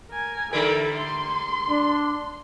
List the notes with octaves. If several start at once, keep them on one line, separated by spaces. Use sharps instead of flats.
A#4 G#5
D3 G3 E4 A4 A#4
C6
D4